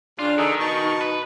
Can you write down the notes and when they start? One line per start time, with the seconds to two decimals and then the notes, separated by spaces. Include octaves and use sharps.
0.19 C#3 D4 F4
0.38 D#3 D#4 G#4 A4
0.60 B2 D#4 A5 C#6
1.01 B4